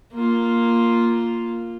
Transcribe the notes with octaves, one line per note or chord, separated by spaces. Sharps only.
A#3 F4